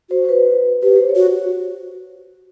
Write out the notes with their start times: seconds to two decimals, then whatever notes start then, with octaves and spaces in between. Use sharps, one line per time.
0.10 F#4 C5
0.24 C5
0.29 B4
0.83 G4 B4
0.96 C5
1.09 C#5
1.16 F#4